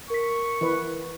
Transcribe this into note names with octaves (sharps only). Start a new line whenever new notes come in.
A#4 C#6 B6
E3 B4